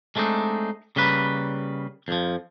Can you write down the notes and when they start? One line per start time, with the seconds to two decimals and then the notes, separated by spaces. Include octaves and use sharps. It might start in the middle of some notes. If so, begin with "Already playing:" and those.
0.16 G#3 A3 C4 D4 D#4
0.96 C#3 G3 A#3 B4
2.08 F2 F3